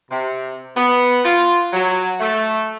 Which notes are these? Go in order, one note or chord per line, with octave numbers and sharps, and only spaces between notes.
C3
B3
F4
F#3
A3